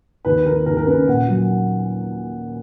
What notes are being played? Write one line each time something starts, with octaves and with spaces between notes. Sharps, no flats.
D#2 B4
D#2 A#4
D#2 A#4
A#4
C#3 B4
A#2 F#5
F#3